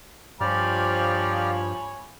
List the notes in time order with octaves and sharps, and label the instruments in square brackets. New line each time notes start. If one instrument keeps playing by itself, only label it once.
[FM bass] G2 [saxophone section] F3 [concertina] G4 D5 F6 [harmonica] C#5 G#5 B5